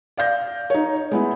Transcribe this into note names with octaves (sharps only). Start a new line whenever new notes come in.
D5 F5 G6 A#6
D#4 C#5
G#3 B3 E4